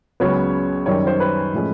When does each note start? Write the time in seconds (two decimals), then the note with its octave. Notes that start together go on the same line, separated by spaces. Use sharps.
0.20 C#2 C#3 F#3 B3 C#5
0.86 F#2 D#3 G3 C#5
1.07 C5
1.20 B4
1.54 A2 F3 G#3 C#4